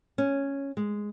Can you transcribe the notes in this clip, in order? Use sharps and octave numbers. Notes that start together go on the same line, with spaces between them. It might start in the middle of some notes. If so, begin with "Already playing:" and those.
C#4
G#3